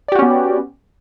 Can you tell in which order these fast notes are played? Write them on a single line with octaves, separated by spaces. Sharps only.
D5 G4 F#4 C#4 B3